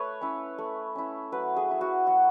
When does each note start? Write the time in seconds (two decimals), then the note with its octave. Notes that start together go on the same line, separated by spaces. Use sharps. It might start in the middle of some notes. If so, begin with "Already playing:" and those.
Already playing: A3 B4 C#5
0.21 C#4 E4
0.58 A3
0.95 C#4 E4
1.32 F#3 B4
1.56 G#4
1.69 A3 E4
1.81 F#4
2.06 F#3 F#4